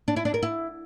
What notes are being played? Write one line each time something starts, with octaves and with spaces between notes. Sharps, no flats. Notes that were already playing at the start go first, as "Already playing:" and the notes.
D4
E4
D4
A#4
E4